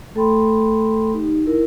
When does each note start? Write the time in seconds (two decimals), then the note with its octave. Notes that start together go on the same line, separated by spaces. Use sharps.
0.15 A3 A4 G5 B5 C6
1.14 D#4 G4
1.46 E4 A#4